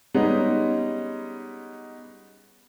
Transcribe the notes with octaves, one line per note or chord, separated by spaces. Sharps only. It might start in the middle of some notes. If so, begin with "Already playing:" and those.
G3 G#3 B3 C#4 D#4